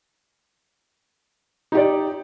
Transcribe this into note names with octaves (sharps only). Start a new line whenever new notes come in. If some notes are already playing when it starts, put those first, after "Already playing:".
D#4 G4 D5